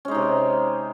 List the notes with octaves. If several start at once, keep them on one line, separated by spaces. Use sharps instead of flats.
C3 G#3 C#4 D#4